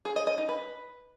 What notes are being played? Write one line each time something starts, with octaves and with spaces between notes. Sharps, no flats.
G#4
D#5
D#5
D#4
B4